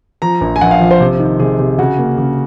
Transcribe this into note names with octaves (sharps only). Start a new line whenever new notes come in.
F3 A#5
A#1
G#5
A#1 F#5
F5
F3
C5
C3
D#3
C3 G#4
C3
C#3 F#4
A#3
C#3